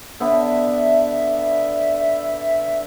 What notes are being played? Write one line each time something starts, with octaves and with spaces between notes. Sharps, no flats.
D3 B3 D4 E5